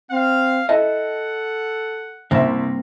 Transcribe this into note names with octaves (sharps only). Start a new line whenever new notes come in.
C4 F5
E4 A4 D#5 F#5 A5
C2 G2 A#3 C4 E5